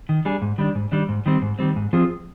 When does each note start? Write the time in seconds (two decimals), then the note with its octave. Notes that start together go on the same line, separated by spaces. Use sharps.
0.09 D#3
0.25 G3 D4 G#4
0.42 G#2
0.58 D#3 G3 D4
0.75 G#2
0.92 D#3 G3 D4
1.09 G#2
1.26 D#3 G3 C4
1.42 G#2
1.59 D#3 G3 C4
1.76 G#2
1.93 F3 C4 F4 G#4